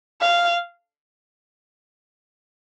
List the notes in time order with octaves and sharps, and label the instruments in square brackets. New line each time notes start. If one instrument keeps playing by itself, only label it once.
[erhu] F5